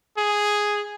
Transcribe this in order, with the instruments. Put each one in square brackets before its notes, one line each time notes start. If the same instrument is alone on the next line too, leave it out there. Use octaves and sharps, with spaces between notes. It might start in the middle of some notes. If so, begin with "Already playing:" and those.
[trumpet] G#4